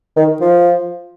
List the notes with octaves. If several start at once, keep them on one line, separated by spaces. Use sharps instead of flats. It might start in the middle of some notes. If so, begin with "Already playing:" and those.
D#3
F3